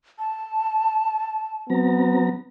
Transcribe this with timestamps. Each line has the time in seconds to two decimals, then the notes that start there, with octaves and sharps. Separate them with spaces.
0.19 A5
1.70 F#3 B3 C4 A#5